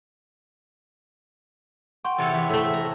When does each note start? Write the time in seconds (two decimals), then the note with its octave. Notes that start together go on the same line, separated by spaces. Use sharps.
2.05 F#5 G5 C6 C#6
2.18 E2 C3 A4 C#5
2.34 E2 E5
2.49 A2 A3 E5
2.74 A#5